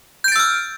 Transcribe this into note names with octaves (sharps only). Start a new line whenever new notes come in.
E6 F6 G6 A6 D7